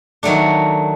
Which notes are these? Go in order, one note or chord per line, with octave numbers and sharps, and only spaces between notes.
D#3 F#3 A3 D4